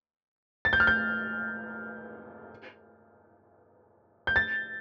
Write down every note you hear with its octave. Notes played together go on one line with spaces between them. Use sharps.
A6
G6
F6
G6
G6
A6